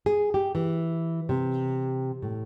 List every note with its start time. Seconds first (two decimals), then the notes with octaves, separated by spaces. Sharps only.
0.06 G#4
0.34 G4
0.55 E3
1.29 C3
2.22 A2